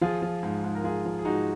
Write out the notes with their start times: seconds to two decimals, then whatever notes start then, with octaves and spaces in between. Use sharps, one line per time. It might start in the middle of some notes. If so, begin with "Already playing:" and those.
0.01 F3 F4 G#4
0.22 F3
0.43 G#2
0.64 G#2
0.75 A#4
0.84 F3 F4 G#4
1.05 F3
1.19 G#4
1.25 G#2 D#4 F#4